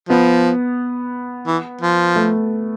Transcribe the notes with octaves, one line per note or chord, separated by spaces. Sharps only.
F3 B3
E3
F3
A3